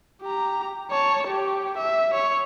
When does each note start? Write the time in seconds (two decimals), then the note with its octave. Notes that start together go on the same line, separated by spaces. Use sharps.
0.22 G4 A#5
0.91 C#5 A5
1.27 G4
1.78 E5
2.14 C#5